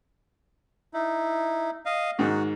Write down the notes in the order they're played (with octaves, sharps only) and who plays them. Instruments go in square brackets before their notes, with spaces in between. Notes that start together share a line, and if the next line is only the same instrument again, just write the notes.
[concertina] D#4 E4
D#5 F5
[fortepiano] G#2 D#3 [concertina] F#4